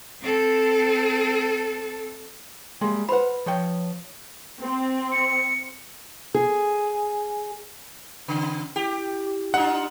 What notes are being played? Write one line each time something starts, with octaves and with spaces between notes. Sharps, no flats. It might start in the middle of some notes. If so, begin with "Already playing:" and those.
C4 A4
G3 G#3 A#3
B4 C5 F#5 B5
F3 C#5 G5
C4
C#7
G#4
C#3
E4 G4
D4 D#4 F4 F#5